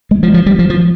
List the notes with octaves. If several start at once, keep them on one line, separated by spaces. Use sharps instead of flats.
G#3
F3
F3
G3
F3
F3